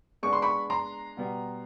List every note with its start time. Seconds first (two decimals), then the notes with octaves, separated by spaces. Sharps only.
0.23 G#3 B3 D4 C#6
0.33 C6
0.42 B5 C#6
0.70 A#5 C6
1.17 B2 G3 B3